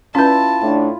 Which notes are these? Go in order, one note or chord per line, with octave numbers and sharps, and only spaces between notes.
C#4 E4 F4 B4 A5
A2 D4